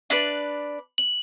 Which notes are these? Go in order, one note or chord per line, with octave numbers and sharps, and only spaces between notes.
D4 B4 D5
F#7